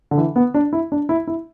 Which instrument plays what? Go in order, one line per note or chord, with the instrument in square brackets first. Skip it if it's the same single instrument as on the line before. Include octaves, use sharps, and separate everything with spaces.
[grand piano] D3
E3
B3
D4
E4
D4
E4
E4